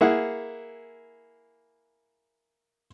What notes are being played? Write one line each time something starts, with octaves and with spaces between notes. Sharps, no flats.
A#3 E4 G#4 F#5